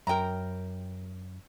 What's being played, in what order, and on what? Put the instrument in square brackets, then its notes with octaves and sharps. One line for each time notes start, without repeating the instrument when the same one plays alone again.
[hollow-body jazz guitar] F#2 A#4 [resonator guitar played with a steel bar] G5 A#5